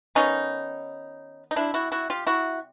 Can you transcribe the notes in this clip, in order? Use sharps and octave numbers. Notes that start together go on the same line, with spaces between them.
D#3 F#3 B3 C#4 D#4
D#4
C3 E3 G3 D4 E4
E4 F#4
E4 F#4
F4 G4
E4 F#4